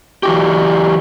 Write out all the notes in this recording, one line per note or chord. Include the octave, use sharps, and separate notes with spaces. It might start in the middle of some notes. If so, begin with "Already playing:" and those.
E3 F#4 G4